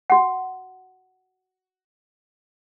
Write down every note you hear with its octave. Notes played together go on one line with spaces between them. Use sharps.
F#4 F#5